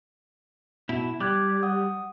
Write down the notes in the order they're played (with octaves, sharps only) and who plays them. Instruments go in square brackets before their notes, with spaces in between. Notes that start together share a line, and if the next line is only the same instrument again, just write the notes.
[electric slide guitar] B2 E4
[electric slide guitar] G3 [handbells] D6 F#6 G#6
[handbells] F#5 D#6